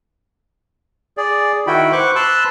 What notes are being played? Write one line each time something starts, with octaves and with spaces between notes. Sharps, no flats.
G#4 D5
D#3 E4 F#4 G5 B5
B4 C5 C#6 D6 F#6
B4 A5 C6 E6 F#6